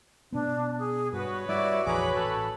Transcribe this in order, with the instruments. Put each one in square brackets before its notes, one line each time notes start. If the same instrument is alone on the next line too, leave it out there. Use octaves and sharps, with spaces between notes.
[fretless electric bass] B2 B3 [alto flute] D4
[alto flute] G#4
[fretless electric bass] G2 [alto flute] F#4 [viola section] B4 C#5
[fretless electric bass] G3 [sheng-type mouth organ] E4 D5 [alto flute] F#4
[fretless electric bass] A#1 F2 E3 [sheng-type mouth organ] G#4 D6 [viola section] B4 C#5 B5
[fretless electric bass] A1 [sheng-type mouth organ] A4